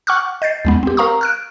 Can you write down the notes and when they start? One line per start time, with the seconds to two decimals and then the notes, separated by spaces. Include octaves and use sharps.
0.07 F#5 C#6 D6 F6 F#6
0.42 D#5 G6 A6 C7
0.65 D#2 G#3 B3
0.83 C4 G4
0.97 A#4 F5 A#5 C#6 D#6
1.21 F6 F#6 D7